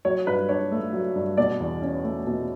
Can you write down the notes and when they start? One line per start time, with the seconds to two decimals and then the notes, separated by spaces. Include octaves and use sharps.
0.05 F#3 C#5
0.27 G2 B4
0.49 D4 C#5
0.71 A3
0.93 F#3
1.15 G2
1.37 B2 D5
1.60 E2
1.82 C#4
2.04 A3
2.27 B2